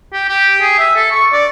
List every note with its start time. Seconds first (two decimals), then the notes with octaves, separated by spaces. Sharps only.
0.13 G4
0.29 G4
0.62 G#4
0.78 E5
0.96 A4
1.11 C#6
1.33 D5